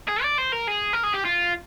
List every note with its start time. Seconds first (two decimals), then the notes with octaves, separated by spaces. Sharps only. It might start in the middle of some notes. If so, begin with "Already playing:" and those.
0.08 G#4
0.22 D5
0.38 C5
0.52 A#4
0.67 G#4
0.93 A#4
1.04 G#4
1.14 G4
1.25 F4